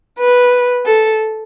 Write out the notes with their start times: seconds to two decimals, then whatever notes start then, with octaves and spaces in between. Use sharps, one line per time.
0.18 B4
0.86 A4